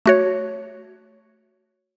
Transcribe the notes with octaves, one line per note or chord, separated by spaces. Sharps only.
A3 F#4 C#5